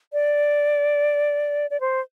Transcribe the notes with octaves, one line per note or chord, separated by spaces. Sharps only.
D5
D5
C5